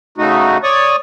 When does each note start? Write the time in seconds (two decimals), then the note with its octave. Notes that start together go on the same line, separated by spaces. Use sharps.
0.18 C#3 A3 D#4 F#4
0.63 C#5 D5 C#6 D#6